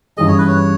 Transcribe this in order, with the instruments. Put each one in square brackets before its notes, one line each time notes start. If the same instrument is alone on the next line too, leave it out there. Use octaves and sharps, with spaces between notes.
[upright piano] G2 E3 G3 C#4 G#4 [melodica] D#5
[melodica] C#5
B4
C#5